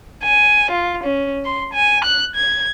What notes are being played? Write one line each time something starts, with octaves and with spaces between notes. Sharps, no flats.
G#5
F4
C#4
C6
G#5
F#6
G#6